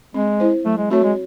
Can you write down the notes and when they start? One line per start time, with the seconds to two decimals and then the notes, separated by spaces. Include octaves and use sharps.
0.14 G#3 C4
0.40 E4 C5
0.65 F#3 A3
0.77 G#3
0.90 A3 C4 F#4 C#5
1.04 G#3